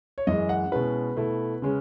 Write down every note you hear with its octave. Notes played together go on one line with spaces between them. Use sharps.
C#5
F#2 E3 G#3 D#5
F#5
B2 G#3 C#4 E4 B4
B2 A3 E4
C#3 G#3 C#4